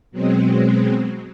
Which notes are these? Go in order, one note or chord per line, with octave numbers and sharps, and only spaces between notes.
B2 F#3 G#3 C4